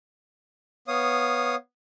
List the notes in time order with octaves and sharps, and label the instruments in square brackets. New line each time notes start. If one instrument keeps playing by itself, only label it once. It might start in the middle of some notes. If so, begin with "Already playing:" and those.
[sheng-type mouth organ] B3 C#5 F5 D#6